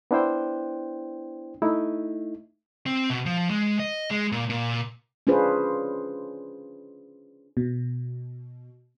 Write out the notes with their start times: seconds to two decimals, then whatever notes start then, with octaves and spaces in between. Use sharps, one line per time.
0.11 B3 D4 E4 C5 G5
1.62 A3 D#4 E4
2.86 C4
3.10 B2
3.26 F3
3.50 G#3
3.79 D#5
4.11 G#3
4.32 A#2
4.50 A#2
5.27 C#4 D4 F4 G#4 B4 C5
7.57 B2